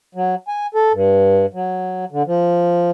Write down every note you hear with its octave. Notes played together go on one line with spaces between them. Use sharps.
F#3
G#5
A4
G2
F#3
D3
F3